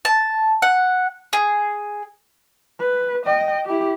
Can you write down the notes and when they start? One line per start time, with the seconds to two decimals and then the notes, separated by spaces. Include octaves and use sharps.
0.05 A5
0.62 F#5
1.33 G#4
2.80 B4
3.26 D#5 G5
3.66 E4 G4